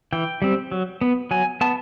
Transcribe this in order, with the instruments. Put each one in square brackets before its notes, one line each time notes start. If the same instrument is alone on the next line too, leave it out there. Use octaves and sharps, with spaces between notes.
[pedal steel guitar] E3 G5
G3 C4
F#3
B3
F#3 G#5
B3 A5